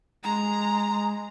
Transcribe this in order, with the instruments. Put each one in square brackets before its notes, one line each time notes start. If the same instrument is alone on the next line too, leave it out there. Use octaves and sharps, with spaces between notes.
[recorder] G#3 [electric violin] A#5